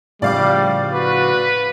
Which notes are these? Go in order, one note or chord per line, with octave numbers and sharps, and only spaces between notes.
A2 C#3 F3 G3 D5 F5 D6
F#4 B4